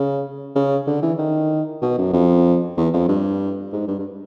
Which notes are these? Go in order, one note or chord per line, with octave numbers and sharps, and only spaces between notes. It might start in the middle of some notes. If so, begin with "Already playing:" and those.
Already playing: C#3
C#3
D3
E3
D#3
B2
F#2
F2
E2
F2
G2
G#2
G2
G2